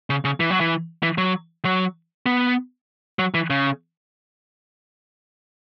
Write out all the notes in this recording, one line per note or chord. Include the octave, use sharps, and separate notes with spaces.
C#3
C#3
E3
F#3
E3
E3
F#3
F#3
B3
F#3
E3
C#3